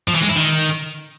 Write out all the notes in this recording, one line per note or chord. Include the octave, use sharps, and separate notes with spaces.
F3
E3
G#3
E4
D#3